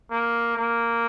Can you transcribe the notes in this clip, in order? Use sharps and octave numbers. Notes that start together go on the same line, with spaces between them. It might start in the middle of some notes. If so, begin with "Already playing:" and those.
A#3
A#3